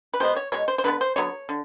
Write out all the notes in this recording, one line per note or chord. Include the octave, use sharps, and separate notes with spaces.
B4
B2 G#3 B3 C5
C#5
B2 G#3 C#5
C5
C5
D3 F#3 B3 B4
C5
D3 F#3 B3 C#5
D3